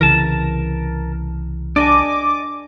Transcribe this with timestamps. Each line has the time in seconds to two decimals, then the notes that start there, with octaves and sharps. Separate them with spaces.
0.01 C2 C#3 E3 A#4 A5
1.76 D4 D5 D#5 G#5 D6